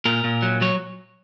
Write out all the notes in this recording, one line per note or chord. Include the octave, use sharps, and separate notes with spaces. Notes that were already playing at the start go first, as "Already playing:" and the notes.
A#2 A#4
A#2
F#3
F#3 C#5